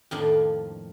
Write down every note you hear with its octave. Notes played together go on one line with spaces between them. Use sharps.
F2 A2 D#3 F3 A#3 D4